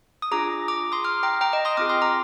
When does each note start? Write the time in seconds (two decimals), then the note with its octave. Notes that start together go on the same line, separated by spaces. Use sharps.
0.22 D#6
0.31 D4 F4 G#4 A#5 D6
0.68 A#5 D6
0.92 C6 D#6
1.04 D6 F6
1.23 G5 A#5
1.41 G5 A#5
1.53 D#5 G5
1.65 C6 D#6
1.77 C4 F4 G#4 D6 F6
1.89 C6 D#6
2.02 A#5 D6